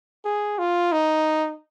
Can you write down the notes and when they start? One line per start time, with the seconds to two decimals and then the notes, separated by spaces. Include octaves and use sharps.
0.25 G#4
0.59 F4
0.92 D#4